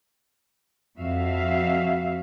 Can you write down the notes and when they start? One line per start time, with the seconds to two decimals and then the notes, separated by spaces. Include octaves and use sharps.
0.98 F2 F#4 E5 F5